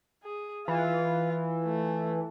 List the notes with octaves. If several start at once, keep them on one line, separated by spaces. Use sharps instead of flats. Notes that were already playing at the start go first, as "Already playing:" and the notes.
G#4
E3 F4
A3